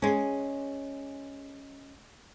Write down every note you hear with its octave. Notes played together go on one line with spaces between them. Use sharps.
G#3 C#4